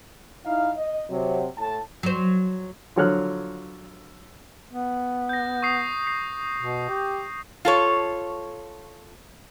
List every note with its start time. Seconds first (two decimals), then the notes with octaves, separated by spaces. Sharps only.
0.45 D#4 E4 F5
0.76 D#5
1.10 C3 F#3
1.58 A2 A5
2.03 F#3 C5
2.96 D3 F3 F#3 C#5 F6 F#6
4.71 B3
5.29 G6 A#6
5.63 C#6 D#6 C7
6.07 C7
6.59 B2
6.89 G4
7.65 F4 A4 C#5